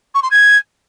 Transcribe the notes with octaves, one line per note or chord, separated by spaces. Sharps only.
C#6
C6
G#6